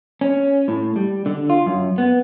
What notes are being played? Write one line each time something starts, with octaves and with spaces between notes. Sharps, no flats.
C#4
A2
G3
D3
F4
F#2
B3